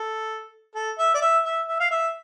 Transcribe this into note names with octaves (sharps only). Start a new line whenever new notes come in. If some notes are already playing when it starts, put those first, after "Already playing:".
Already playing: A4
A4
E5
D5
E5
E5
E5
F5
E5